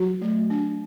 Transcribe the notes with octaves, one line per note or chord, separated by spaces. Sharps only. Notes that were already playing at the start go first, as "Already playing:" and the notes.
Already playing: F#3 F#4
A3
D4